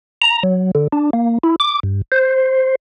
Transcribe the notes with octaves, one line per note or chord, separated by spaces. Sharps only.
A#5
F#3
D3
D4
A#3
E4
D6
G2
C5